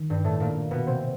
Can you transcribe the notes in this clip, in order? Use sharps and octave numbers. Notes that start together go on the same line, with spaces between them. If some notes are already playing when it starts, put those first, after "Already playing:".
Already playing: D#3
G2 G3
A2 A3
A#2 A#3
B2 B3
C3 C4